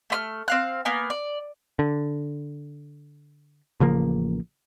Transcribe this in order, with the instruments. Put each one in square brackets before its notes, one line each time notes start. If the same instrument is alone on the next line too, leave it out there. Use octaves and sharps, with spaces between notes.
[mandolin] A3 B5 F6
C4 F5 F#6
A#3 B3 G#5
D5
[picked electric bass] D3
A1 C#3 F3 A#3